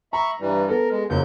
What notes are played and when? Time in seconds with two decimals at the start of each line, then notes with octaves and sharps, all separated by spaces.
0.13 E5 A#5 B5 C#6
0.40 G2 E3 G3
0.69 B3 A4 A#4
0.90 G#3
1.10 F#1 F#3 A#3 G6